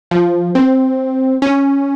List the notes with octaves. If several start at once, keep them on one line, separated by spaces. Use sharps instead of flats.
F3
C4
C#4